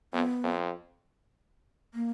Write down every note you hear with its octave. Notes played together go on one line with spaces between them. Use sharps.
F2 B3
F2
A#3